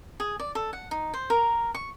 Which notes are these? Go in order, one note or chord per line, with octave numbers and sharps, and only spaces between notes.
G#4
D5
A4
F#5
D#4
C5
A#4
C#6